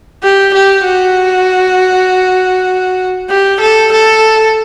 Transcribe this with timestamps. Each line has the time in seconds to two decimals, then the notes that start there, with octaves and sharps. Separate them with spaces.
0.23 G4
0.54 G4
0.85 F#4
3.30 G4
3.61 A4
3.92 A4